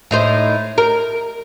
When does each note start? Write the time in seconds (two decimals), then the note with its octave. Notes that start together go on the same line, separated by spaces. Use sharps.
0.11 A2 D#4 C5
0.78 A#4